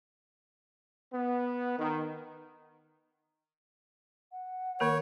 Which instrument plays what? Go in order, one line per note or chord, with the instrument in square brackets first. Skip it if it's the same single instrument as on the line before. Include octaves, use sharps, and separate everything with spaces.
[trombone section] B3
D#3
[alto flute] F#5
[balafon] D#3 A#3 A#4 [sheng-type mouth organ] C#5